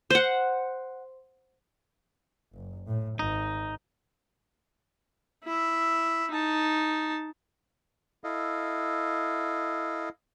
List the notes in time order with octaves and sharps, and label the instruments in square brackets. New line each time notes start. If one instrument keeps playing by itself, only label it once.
[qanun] C5 F#5
[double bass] F#1
A2
[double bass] G#1 [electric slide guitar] D#4
[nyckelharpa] E4 E5
D#4 A5
[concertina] E4 A4 D#5 F5